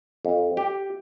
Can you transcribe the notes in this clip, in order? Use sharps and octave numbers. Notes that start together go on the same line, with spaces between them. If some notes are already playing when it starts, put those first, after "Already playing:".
F2
G4